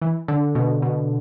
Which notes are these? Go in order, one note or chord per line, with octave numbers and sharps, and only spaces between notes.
E3
D3
B2
B2